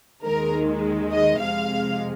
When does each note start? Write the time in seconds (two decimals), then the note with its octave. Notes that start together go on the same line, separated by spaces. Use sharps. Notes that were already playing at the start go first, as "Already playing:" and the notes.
0.23 D#2 D#3 G#3 A#4
1.11 D#5
1.41 F2 C3 G#3 F5